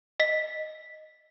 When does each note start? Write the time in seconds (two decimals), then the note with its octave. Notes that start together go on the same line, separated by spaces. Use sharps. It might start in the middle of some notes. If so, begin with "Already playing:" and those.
0.20 D#5 B6